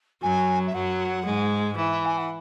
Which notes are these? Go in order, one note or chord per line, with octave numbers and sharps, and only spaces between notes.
F#2 F#3 G#5
E5
F#2 F#3 F#5
G#2 G#3
E3 E5
G#5
F#5